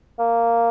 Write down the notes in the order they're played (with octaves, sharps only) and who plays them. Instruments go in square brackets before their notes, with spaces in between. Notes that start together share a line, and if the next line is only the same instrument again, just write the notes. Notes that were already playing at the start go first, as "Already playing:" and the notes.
[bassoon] A#3